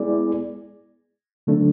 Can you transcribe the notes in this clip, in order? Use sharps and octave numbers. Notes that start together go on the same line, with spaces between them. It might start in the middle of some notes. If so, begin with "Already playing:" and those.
Already playing: G#3 B3 E4 G#4 D5
D3 F#3 A3 D4